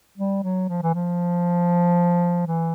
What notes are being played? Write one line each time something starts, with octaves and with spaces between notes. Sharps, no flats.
G3
F#3
F3
E3
F3
E3